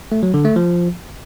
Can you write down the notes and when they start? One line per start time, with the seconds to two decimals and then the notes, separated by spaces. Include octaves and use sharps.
0.12 A3
0.23 F#3
0.34 D3
0.45 A3
0.56 F3